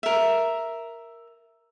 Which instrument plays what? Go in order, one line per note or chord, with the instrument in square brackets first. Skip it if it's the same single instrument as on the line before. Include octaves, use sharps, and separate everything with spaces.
[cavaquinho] A#4 E5